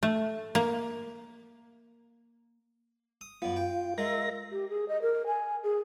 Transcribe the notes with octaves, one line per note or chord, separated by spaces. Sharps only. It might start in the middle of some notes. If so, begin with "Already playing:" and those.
A3
A#3
D#6
F#2 B3 F4
G5
G#3 F4 A#4 E5 A#6
G4
G#4
D#5
A#4
G#5
G#4